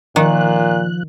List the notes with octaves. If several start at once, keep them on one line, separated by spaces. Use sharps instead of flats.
A#2 D#3 F3 F#6